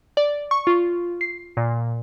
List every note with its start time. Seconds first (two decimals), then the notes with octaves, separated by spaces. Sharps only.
0.17 D5
0.51 C#6
0.67 F4
1.21 C7
1.57 A#2